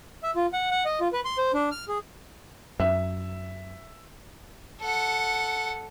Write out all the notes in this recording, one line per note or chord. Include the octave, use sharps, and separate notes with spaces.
E5
F4
F#5
F#5
D#5
F4
B4
C6
C5
D4
F6
G#4
F#2 E5
A4 F#5